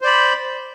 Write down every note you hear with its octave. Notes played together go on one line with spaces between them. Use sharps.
C5 D5 B5